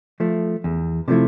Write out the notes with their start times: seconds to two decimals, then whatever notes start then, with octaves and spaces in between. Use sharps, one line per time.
0.20 F3 A3
0.64 E2
1.08 C3 F3 A3 E4